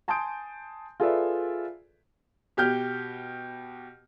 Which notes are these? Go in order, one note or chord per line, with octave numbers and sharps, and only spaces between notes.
G#5 A5 C6 D#6 G6 D7
F4 G#4 A4 B4 D5 E5
B2 G4 F6 G6